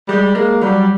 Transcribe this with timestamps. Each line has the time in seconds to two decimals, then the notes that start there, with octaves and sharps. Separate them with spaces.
0.09 G3 G#3
0.35 G#3 A#3
0.61 F#3 G3